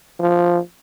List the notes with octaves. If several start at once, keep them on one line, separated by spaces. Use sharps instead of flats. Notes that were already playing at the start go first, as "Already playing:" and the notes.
F3